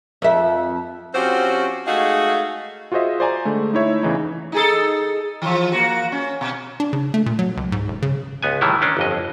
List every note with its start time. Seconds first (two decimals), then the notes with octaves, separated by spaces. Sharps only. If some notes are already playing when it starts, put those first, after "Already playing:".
0.22 F2 E5
1.15 F3 C4 C#4 F#4 G4 C5
1.87 G#3 A3 D#4 F#4 G#4 F5
2.92 F4 F#4 G#4 C5 D#5 E5
3.20 C5 D5 G#5 A#5
3.45 D3 G#3 A3
3.73 A3 D#4 E4 C#5 E5
4.03 E2 C#3 E3 D#4
4.52 D#4 G#4 A4
5.42 E3 F3
5.72 A#3 F#4
6.12 C#4
6.41 B2
6.80 D4
6.93 C#3
7.14 A3
7.26 A#2
7.39 F#3
7.57 C#2
7.72 G#2
7.88 E1
8.02 C#3
8.43 C#2 B3 G#5
8.61 A2 D#3 E3 G3 E4
8.81 D#3 C#4 D4
8.97 G1 F2 D#5